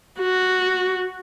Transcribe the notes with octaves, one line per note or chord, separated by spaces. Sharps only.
F#4